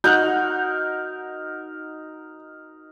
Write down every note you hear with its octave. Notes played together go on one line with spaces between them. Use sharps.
D#4 F#4 A#4 F#6 G6